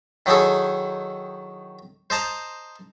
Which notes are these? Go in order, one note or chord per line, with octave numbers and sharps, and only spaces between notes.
D#3 F#3 D#4 E4 G#4 A4
C5 D#5 A5 A#5